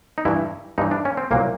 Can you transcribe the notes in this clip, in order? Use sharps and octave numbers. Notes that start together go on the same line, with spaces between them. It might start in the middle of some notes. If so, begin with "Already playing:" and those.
D#4
G2 E3 E4
G2 E3 D#4
D4
C#4
C4
C2 A#2 F#3 A#3